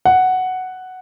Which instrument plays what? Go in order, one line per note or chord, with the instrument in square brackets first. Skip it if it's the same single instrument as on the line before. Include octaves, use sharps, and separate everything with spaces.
[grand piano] F#5